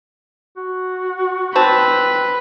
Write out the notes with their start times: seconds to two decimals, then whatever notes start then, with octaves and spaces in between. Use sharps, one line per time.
0.57 F#4
1.56 C4 D#4 B4 A5